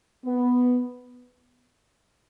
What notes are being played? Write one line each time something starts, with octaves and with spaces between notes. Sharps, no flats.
B3